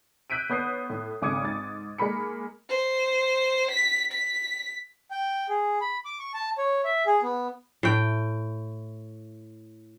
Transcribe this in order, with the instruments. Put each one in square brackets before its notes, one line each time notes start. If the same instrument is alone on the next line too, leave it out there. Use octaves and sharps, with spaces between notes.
[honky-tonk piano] E6 F#6 G6 B6 D7 D#7
B3 C#5 D#6 G6 C7
A2
G#1 C#3 D6 D#6 G#6 C#7
G#2 A6
G#3 A#3 B5 C#7
[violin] C5
B6
B6
[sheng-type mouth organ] G5
G#4
B5
D6
C#6
A5
C#5
E5
G#4
B3
[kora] A2 G5